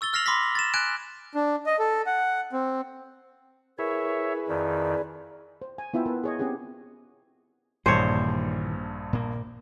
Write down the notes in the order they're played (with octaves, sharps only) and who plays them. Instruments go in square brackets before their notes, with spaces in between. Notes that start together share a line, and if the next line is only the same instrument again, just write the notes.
[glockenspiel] C#6 E6 A6 G7
E6 F6 A#6 C7 F7 F#7
B5 C6 D6 F6 A#6 B6
A6 E7
G#5 F#6 G#6 D7 E7
[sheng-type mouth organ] D4
D#5
A4
F#5
C4
[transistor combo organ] E4 G#4 B4 [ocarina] A#4 [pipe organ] C#5 E5
[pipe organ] F2 D#3 [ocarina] D5
[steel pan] C5
G#5
B3 E4 F4 E5 G5 G#5
B3 A#4 B4 A5
G#4 C#5 D#5
C4 C#4 G4 G#4 F#5
[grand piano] A#1 G2 [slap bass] A#2 D#3 E3 [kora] C5 C#5
[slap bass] A#2 A#3